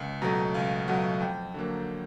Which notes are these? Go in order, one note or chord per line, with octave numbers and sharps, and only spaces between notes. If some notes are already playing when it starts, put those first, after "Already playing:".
Already playing: C#2
B2 F#3 A3 A#5
C#2 F5
B2 F#3 A3 F#5
F2 G5
D3 F#3 A#3